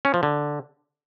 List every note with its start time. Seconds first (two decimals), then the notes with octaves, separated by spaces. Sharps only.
0.05 C#4
0.14 F3
0.23 D3